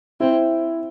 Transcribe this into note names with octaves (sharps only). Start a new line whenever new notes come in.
C4 E4